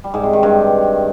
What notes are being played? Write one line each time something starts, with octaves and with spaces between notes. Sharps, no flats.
G3
G#2
C3
D#3
G2